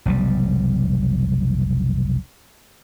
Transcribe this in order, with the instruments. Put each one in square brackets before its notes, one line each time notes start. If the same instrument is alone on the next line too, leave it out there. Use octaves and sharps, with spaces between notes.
[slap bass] F1 B1 G3